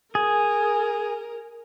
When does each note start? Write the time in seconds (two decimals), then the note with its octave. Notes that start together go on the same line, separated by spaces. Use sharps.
0.15 G#4 A#4